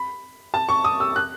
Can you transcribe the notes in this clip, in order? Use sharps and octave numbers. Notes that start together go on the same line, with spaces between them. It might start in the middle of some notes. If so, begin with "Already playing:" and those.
Already playing: B5
A5
C#6
D#6
E6
F#6